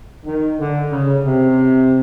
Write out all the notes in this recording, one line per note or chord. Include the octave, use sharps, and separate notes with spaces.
D#3
D3
C#3
C3